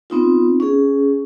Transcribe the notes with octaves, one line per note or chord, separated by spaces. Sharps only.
B3 C4 D#4 F4
C#4 G#4